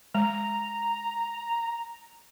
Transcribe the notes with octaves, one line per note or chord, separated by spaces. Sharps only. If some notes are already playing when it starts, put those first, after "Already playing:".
G#3 A#5